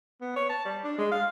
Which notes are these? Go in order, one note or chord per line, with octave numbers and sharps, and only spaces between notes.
B3
C#5
A5
G3
D4
G#3
F5